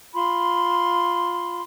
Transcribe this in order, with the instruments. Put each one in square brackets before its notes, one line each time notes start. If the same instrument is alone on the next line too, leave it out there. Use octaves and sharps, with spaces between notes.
[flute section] F4 B5 C6